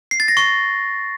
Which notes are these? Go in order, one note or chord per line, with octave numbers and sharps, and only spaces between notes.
C7
A6
A#6
C#6